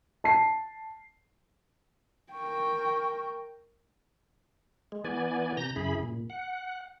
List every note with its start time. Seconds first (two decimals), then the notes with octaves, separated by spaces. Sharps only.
0.24 A5 C7
2.33 A#4 G5 C#6
4.92 G#3
5.05 E3 B3 D5 G#5
5.57 C3 A#5 G6 A#6
5.76 F#2 C#3 E4 G#4 B5
6.03 A#2
6.30 F#5